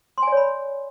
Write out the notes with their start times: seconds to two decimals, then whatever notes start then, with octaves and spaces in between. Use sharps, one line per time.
0.18 C6
0.22 G#5
0.27 D5
0.32 C#5
0.37 B5